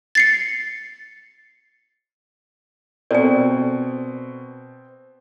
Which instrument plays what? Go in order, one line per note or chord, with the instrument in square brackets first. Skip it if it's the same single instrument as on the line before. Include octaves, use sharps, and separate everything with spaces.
[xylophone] A6 C7 C#7
[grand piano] B2 [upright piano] C4 [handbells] A4 A#4 C5 [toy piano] D5 G#5